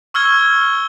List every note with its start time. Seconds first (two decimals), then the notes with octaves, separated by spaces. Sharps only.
0.14 C#6 E6 F6 G#6 G7